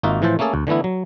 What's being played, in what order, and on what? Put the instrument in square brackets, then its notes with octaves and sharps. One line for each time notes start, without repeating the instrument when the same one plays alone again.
[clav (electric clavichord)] G#1 A#3 D#4 F4 F#4 E5
A2 E3 F3 A4 C5 A5
A3 A#3 C#4 G#4 A4
D2
D3 E3 A3 B3 E4
F#3